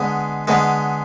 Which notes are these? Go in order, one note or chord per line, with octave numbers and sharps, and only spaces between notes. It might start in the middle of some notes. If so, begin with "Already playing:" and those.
Already playing: D3 G#3 B3
D3 G#3 B3